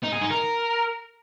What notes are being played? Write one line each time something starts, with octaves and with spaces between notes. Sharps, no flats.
D#4
G#4
D#4
A#4